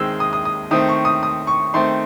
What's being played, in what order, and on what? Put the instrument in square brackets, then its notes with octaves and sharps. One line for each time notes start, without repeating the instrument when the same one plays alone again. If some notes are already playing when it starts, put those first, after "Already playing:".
Already playing: [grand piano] D#3 G#3 C4 E6
D#6
D#6
D#6
D#3 A3 C4 D#6
C#6
D#6
D#6
C#6
D#3 A3 C4 C6